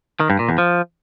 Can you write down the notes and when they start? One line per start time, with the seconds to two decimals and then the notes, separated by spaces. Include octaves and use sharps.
0.20 D#3
0.30 G2
0.39 A#2
0.49 E2
0.58 F3